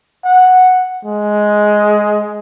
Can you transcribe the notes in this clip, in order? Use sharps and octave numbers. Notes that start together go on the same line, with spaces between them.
F#5
G#3